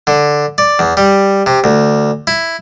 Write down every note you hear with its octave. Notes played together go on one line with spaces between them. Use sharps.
D3
D5
E2
G3
C3
D2
E4